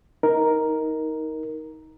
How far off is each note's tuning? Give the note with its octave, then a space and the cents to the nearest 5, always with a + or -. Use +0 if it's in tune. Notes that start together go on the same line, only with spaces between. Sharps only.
D#4 +20 A#4 +0